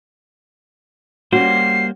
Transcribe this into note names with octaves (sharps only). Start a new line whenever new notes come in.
G3 A#3 C#4 F#4 C5 C7